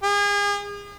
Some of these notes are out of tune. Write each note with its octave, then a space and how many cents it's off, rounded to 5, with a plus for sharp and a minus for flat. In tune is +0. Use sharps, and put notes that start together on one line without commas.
G#4 -35